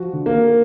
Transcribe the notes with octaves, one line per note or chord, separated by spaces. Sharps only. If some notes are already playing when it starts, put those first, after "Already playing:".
Already playing: F3 F#4
D3
A#3